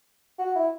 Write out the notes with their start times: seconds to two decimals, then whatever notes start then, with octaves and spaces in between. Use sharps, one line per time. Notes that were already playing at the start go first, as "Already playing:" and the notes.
0.39 F#4
0.56 E4